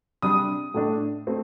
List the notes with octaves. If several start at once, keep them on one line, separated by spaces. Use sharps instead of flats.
C3 G3 D4 D#6
A2 A3 D4
A3 C4